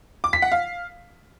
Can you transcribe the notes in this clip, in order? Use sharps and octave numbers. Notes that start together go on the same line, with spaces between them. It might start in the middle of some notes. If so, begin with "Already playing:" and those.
D6
B6
F#5
F5